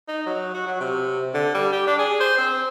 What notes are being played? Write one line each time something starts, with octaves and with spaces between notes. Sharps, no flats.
D#4
F#3
F#4
F#3
C3
D3
G3
G4
D4
G#4
C5
C4